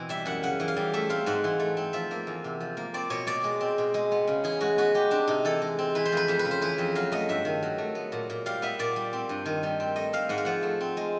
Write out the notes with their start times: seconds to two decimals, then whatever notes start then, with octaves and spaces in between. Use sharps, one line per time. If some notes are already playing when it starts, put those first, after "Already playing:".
Already playing: B2 E3 C4
0.09 G3 E5
0.26 F#2 F#5
0.43 C#3 F#5
0.60 E3
0.68 F5
0.77 G3
0.94 A3 E5
1.09 C4 F5
1.26 G#2 F#5
1.44 E3
1.60 A3
1.77 C4
1.93 F3 E5
2.11 A#3
2.27 E2
2.44 C3
2.60 F3
2.77 A#3
2.94 C4 D5
3.10 B2 C#5
3.27 B2 D5
3.44 G#3
3.61 C4
3.78 B2
3.94 G#3
4.12 B3
4.28 C#3
4.44 E3 G#4
4.61 G#3 F#4
4.78 B3 F#4
4.94 G#3 G4
5.10 C4 D4
5.27 C3 D#4
5.45 E3 A4
5.61 G#3
5.79 C4
5.95 E3 B4
6.05 C5
6.12 F2 B4
6.28 F2 C5
6.39 B4
6.45 C#3
6.51 C5
6.62 E3 B4
6.78 F2
6.95 F#3 F5
7.12 A3 D#5
7.29 G2 E5
7.45 D#3
7.63 F#3
7.78 A3
7.95 B3
8.12 A#2
8.30 A#2
8.46 G3 F5
8.62 B3 E5
8.79 A#2 D5
8.96 G3
9.13 C4
9.29 G2
9.46 D#3
9.63 G3
9.80 C4
9.96 A3 D#5
10.13 C4 F5
10.29 G#2 F#5
10.38 F5
10.45 F3 F#5
10.63 A3
10.81 C4
10.97 G#3